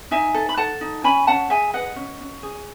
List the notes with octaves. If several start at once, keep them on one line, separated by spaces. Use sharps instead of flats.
D#4 E5 G#5
A4
B5
A4 F#5 A5
D#4
C#4 G#5 B5
C#4 F#5 A5
G#4 E5 G#5
B4 D#5 F#5
C#4
C#4
G#4